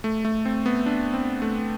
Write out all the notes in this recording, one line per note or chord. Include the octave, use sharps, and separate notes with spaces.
A3
A3
C4
B3
D4
C4
A3